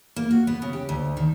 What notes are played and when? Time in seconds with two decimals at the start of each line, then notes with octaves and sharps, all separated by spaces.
0.16 A#3
0.31 F#4
0.47 B3
0.62 C#3
0.73 G4
0.89 D2
1.17 D#3